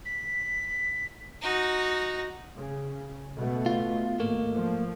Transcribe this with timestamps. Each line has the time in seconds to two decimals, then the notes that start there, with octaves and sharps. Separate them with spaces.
0.05 B6
1.42 D#4 F#4
2.57 C#3
3.36 B2 A3 B3
3.66 F4
4.20 G#1 A3 A#3
4.54 F3